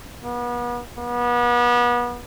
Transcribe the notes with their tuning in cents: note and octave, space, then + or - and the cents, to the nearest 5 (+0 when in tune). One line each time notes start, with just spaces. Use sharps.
B3 -35
B3 -35